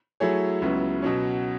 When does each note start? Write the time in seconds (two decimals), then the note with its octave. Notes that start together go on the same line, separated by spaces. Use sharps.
0.20 F#3 A3 E4 G#4 C#5
0.62 C#2 C#3 F#3 B3 E4
1.02 B2 F#3 C#4